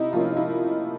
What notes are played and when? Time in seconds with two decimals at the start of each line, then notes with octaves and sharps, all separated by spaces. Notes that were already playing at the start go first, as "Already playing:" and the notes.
Already playing: C3 D#4 E4
0.13 F3 A#3 C#4 F4
0.37 E4